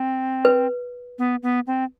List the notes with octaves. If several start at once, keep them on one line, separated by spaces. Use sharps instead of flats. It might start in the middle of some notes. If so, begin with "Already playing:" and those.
Already playing: C4
B4
B3
B3
C4